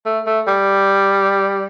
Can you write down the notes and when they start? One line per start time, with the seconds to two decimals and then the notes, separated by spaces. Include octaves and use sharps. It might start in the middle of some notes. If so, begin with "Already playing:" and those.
0.06 A3
0.26 A3
0.47 G3